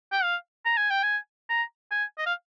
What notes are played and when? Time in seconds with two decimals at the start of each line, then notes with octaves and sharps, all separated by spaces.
0.12 G5
0.23 F5
0.65 A#5
0.77 G#5
0.90 G5
1.03 G#5
1.50 A#5
1.91 G#5
2.18 D#5
2.26 F5